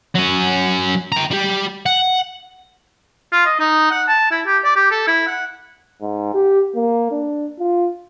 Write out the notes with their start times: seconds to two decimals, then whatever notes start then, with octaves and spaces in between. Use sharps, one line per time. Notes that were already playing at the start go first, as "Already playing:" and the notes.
0.15 F#3 C#4
1.12 G5 A#5
1.31 G3 G4
1.86 F#5
3.33 F4
3.46 D#5
3.59 D#4
3.91 F#5
4.08 A5
4.31 E4
4.46 G4
4.64 D5
4.76 G4
4.91 A4
5.07 E4
5.27 F#5
6.01 G#2
6.34 G4
6.75 A#3
7.11 D4
7.59 F4